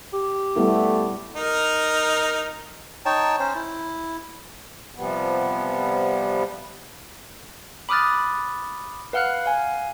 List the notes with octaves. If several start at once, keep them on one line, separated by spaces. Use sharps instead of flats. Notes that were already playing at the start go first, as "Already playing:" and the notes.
G4
G3 A3 B3 E4
D#4 A#4
D#4 C#5 G5 A5
C#4 C5
E4
C3 F3 G3 B3
B5 D6 D#6 F6 F#6 A6
B4 F5 F#5 F6 F#6
F5 G#5